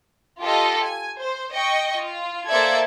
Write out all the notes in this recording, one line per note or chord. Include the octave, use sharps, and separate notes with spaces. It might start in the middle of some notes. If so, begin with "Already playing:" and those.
F4 G4 A4 D#5
G#5
C5
D#5 G5 C#6
F4
A#3 A4 C5 D5 E5 G#6